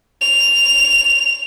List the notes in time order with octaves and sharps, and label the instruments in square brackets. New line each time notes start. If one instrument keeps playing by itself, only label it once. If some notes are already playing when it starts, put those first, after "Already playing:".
[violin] F7